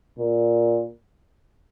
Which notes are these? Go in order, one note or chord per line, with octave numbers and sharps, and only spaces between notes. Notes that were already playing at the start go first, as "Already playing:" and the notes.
A#2